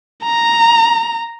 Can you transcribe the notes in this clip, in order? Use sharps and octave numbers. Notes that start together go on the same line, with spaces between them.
A#5